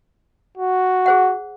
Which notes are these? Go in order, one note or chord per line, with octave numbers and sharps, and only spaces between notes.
F#4
G#4 C5 F#5